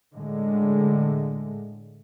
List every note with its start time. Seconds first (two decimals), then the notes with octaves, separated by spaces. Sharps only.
0.14 A2 D3 G#3